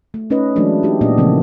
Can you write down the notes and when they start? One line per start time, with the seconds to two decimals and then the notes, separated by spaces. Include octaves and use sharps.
0.14 A3
0.30 A3 C#4 D#4 B4 D#5
0.56 E3 F#3 G#3 A3 D4
0.83 D#4 G4
1.01 A#2 B3 D4 G4 D#5
1.18 C#3 E3 F3 A3 A#3 C4